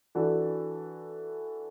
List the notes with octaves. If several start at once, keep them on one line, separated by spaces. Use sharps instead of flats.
E3 D4 F#4 A4